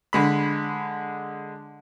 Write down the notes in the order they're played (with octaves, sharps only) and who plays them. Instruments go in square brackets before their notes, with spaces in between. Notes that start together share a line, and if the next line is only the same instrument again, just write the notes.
[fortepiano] D3 G#3 B5